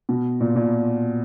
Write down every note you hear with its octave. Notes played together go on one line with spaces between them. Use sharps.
B2
A#2
A#2